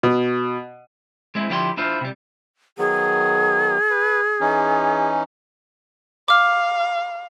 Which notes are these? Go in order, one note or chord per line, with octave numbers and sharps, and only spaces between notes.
B2
G#3 C4 E4
D3 F3 E4 G4 F5 C6
D4 E4 F4 C5
C3 G3
D#3 F#3 B3 G#4
B4
E3 C#4 D#4
F5 D6 F6